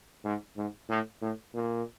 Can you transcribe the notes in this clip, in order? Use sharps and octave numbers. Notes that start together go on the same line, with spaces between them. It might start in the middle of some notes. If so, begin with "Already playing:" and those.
G#2
G#2
A2
A2
A#2